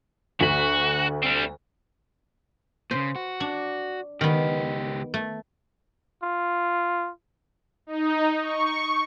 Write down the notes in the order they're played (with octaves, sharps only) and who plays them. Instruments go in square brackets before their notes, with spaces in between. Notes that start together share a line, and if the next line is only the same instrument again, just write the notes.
[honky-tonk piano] D2 B6 F#7 [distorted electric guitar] F#4
[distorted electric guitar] G3 C4
[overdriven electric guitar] A#2 C#3 [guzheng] C5
[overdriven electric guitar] F#4
[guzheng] D4
[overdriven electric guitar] C#2 G4 [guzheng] D#3 B3
[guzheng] A3
[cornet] F4
[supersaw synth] D#4
C#6